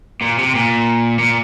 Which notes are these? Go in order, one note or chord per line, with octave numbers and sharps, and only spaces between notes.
A#2
C3
A#2
A#2